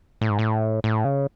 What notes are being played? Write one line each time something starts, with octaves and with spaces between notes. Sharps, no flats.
A2
G#2
A2
A2
C#3